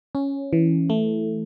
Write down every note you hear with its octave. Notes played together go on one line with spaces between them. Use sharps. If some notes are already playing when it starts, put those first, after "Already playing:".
C#4
E3
A3